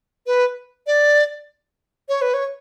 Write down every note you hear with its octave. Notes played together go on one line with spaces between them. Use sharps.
B4
D5
C#5
B4
C#5